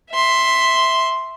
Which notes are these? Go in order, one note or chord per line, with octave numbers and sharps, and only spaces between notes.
E5 C6